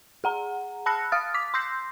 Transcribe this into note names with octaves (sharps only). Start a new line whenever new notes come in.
G#4 F#5 A#5
A5 B5 E6 F#6 A#6 C#7
F5 D#6 F6 A6
D6 B6
C6 E6 G6 A#6 C7